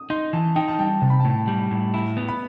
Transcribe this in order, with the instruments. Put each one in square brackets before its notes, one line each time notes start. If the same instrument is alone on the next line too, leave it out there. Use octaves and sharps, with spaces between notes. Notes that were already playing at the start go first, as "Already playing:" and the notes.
Already playing: [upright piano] D#6
[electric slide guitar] D#4 [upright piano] C6
[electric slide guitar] E3 [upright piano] A5
[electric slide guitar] D#4 [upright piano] G5
[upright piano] A5
[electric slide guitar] G3 [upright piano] G5
[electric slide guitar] C3 [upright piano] A5
[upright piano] B5
A5
[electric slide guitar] A2
G3
A2
[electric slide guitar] E4 [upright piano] B5
[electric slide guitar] B3
[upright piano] B5